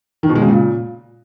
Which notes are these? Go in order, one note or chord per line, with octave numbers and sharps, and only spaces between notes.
D#3
B2
G#3
C#3
A#2